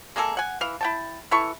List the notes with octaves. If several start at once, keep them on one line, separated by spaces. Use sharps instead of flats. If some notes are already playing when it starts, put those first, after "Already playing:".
G#3 A#3 G#4 A4
F#5 G#5
E3 F5
E4 G5 A5
E3 E4 A4 C#6